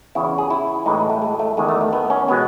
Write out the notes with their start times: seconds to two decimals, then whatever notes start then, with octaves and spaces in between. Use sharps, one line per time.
0.15 E2 C#3 E3 E4
0.38 G#4
0.50 E4
0.86 A2 E3 G#3 D#4
0.98 G#3
1.10 A3
1.22 G#3
1.39 A3
1.57 E2 D#3 G#3
1.69 A3
1.81 A3
1.93 B3
2.10 C#4
2.28 B2 G#3 B3